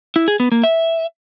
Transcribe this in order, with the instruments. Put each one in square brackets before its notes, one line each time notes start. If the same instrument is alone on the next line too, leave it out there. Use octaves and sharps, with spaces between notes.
[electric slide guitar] E4
G#4
B3
A#3
E5